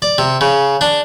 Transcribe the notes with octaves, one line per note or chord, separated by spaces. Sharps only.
D5
C3
C#3
D4